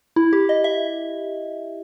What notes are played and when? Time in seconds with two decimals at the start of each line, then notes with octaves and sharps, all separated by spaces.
0.16 E4
0.33 G4
0.49 D#5
0.64 E5